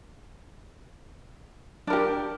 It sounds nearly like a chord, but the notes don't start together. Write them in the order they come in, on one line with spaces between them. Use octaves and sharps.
D4 A#4 G4